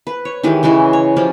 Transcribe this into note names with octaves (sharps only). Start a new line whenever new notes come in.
B4
C#5
D#3 E3 G#3 G4
C#3 E3 G#3 F#4
C#5
F3 C#4 G4 D5